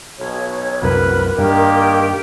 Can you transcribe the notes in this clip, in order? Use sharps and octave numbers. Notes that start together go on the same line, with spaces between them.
B1 C#5
C2 F#2 C3 A#4 B4
G2 D#3 A#3 D4 G4